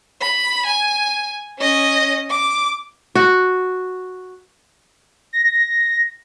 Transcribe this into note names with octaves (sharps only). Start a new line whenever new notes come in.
B5
G#5
C#4 D#5
D6
F#4
A#6